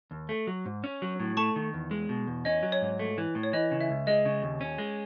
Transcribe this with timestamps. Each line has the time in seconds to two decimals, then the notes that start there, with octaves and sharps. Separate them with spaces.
0.11 D#2
0.29 A3
0.47 F#3
0.65 G#2
0.84 C#4
1.02 F#3
1.20 A2
1.37 A3 A5 C#6
1.56 D#3
1.74 E2
1.91 G#3
2.09 B2
2.27 E2
2.45 C#4 D#5
2.63 F#3
2.72 C#5
2.82 G#2
2.99 A3
3.18 E3
3.35 A2
3.43 C#5
3.53 E3 D#5
3.71 C#3
3.81 E5
3.89 C#2
4.07 G#3 D#5
4.26 C#3
4.43 D#2
4.61 C#4
4.78 G#3